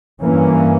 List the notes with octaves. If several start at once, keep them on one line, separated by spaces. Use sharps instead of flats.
G2 E3 A#3 C#4